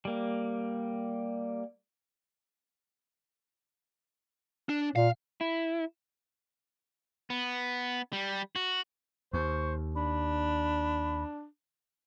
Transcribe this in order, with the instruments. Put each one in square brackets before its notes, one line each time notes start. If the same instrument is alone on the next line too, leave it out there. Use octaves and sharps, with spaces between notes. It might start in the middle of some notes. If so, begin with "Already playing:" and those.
[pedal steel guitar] G3 A#3
[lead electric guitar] D4
[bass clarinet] A#2 [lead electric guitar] F5
[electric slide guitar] E4
[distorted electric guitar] B3
G3
F#4
[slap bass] D#2 [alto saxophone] C5 [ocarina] C#6
[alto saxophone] D4 [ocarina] B5